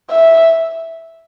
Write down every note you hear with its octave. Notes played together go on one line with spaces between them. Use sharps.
E5